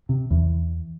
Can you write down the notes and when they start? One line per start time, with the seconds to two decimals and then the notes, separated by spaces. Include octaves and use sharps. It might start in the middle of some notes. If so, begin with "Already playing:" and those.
0.09 C3
0.31 E2